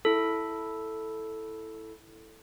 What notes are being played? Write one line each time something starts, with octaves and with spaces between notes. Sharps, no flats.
E4 A4